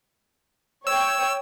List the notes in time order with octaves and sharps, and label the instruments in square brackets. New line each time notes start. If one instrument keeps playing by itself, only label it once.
[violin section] C#5 G5 [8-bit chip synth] E6